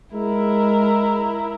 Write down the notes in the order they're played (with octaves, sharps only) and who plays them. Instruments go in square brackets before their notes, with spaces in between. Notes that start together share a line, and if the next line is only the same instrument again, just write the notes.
[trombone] G#3 [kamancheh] E4 A#4